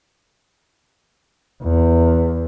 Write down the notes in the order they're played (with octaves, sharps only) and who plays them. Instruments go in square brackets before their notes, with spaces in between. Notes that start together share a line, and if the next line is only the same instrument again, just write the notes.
[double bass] E2